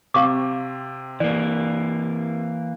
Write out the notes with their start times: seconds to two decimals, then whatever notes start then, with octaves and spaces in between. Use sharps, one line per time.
0.14 C3 C4 F5 C#6 D6
1.20 E3 A#3 D5